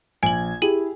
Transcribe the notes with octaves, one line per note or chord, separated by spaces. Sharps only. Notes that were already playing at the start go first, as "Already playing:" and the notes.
A#1 G#5 G#6 F#7
E4 G4 G#4 D#7 F#7